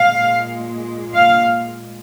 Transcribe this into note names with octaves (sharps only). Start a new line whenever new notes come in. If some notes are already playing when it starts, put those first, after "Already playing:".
Already playing: A#2 G#3 F5
F5